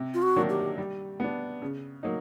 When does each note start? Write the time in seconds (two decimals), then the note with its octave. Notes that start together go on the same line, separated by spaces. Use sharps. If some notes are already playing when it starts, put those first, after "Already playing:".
Already playing: C3
0.14 F4
0.22 F#4
0.36 D#3 F#3 A#3 D4
0.50 G4
0.78 G3
1.20 B3 D4
1.62 C#3
2.03 F#3 A#3 D#4